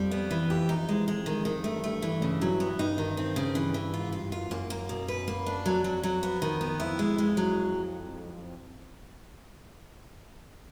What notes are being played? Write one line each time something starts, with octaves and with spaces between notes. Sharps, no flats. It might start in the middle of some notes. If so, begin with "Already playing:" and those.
Already playing: F2 G3
B3
E3
F2 G4
D#4
G#3
G#3
D#3
D#3
G2 A3
A3
E3
C#3
F#3
B3
G2 D#4
D#3
C4
C#3
E3
E3
G#2 F4
G2 F4
F#2 F4
F#2 A#3
A#3
B2
B4
A#3
D4
F2 F#3
F#3
F#3
B3
D#3
B3
F2 E4
G#3
G#3
F#3